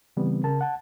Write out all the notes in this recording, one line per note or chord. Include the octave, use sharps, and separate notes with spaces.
C#3 E3 G3 B3 C4
C#3 A#4 A5
F#5 A5